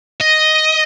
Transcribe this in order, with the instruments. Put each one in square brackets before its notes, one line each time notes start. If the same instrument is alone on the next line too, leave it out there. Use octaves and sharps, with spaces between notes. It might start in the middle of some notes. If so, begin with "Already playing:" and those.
[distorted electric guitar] D#5